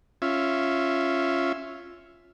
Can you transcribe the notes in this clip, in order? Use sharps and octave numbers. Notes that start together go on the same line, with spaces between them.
C#4 F4 E5